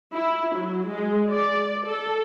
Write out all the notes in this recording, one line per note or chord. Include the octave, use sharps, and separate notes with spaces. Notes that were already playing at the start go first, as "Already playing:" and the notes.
E4
F#3
G#3
D5
A4